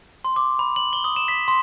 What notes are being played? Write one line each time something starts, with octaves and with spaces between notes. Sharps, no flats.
C6
D6
B5
F#7
G7
D#6
E7
B6
C6